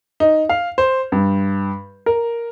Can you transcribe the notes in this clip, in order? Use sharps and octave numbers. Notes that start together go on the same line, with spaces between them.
D#4
F5
C5
G2
A#4